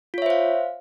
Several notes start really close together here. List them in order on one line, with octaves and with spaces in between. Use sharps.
F4 C#5 E5 C5 F5